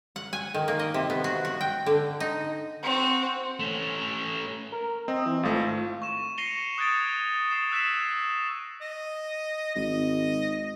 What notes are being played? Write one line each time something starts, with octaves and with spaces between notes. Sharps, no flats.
F#5
G#5
D#3
A#3
D#5
C3
B3
F#4
F#4
G5
D3
D#4
C4 F#4
A3 C#4
A#4
C4 D#5
E3
G#1 A3 F4
C#6 E7
A#6 C7 C#7 D#7 F7 G7
D#6 F#6 G#6 A6 D7 G7
D#6 C7 E7
E6 F#6 B6 C7 E7
D#5
G#1 D#5